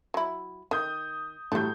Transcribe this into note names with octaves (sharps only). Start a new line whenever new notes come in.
F#3 E4
D#3 D#6 G6
A2 F#3 G3 A3 G6